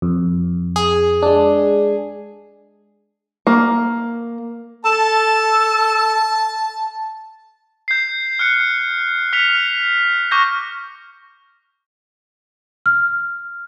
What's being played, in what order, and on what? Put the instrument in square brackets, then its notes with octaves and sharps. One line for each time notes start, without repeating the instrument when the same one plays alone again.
[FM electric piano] F2
[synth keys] G#4
[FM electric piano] G#3 D4
[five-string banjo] A#3
[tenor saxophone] A4 [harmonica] A5
[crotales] G6 C7
F6 F#6 C#7
F6 B6 C#7 F7
C#6 D6 F6 G6 A#6
[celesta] F6